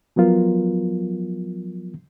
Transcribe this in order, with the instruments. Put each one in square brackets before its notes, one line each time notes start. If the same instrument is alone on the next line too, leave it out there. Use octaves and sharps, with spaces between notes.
[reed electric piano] F3 F#3 B3 F4 A#4